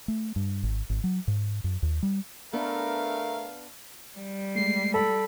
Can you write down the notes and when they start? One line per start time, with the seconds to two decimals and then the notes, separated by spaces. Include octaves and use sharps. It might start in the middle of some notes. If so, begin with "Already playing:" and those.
0.08 A3
0.36 G2
0.63 G#1
0.90 G#1
1.04 F#3
1.28 G#2
1.64 F#2
1.83 D#2
2.03 G3
2.53 A3 B3 D4 A#4 F5
4.18 G3
4.56 G#3 A3 C7
4.94 A4 B5